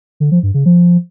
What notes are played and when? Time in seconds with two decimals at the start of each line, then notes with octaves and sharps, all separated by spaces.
0.20 D3
0.32 F3
0.43 G2
0.54 C#3
0.66 F3